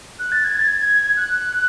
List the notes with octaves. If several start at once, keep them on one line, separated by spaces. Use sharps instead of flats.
F#6
A6
G#6
A6
G#6
F#6